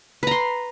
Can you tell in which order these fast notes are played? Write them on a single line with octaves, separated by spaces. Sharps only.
B4 A#5 C6